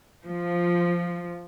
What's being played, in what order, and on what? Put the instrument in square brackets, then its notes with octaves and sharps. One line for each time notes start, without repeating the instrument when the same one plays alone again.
[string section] F3